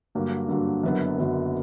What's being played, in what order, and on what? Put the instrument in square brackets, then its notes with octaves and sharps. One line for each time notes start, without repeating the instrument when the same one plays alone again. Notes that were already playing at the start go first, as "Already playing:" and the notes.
[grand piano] G2 D3 F#3 A#3
G2 D3 F#3 A#3
F#1 F#2 D3 F#3 B3
F#1 F#2 D3 F#3 B3